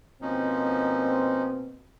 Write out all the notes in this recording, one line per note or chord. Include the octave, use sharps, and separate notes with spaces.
B2 F3 A#3 C4 C#4 D#4